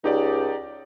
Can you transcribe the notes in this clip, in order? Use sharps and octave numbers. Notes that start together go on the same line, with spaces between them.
C#2 D#4 G4 D5